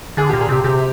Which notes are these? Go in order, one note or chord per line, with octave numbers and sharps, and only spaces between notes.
D3 G#4
A#2 G4
G#4
C3 G4
C3 G4